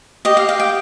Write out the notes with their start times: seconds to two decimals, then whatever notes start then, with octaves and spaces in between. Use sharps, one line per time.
0.25 G4 D#5
0.37 F5
0.48 G4 F5
0.60 G5